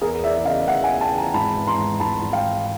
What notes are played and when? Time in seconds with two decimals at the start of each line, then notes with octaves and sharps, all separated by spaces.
0.01 E2 G#4 A#4
0.24 E3 D5 E5
0.36 E5
0.45 C#3 D#5 F5
0.68 E2 E5 F#5
0.84 F#5 G#5
0.90 E2
1.01 G5 A5
1.12 E3
1.17 G#5 A#5
1.34 G#1 A5 B5
1.57 E3
1.67 A#5 C6
1.78 G#2
2.00 G#1 A5 B5
2.22 G#1
2.33 F5 G5
2.45 E3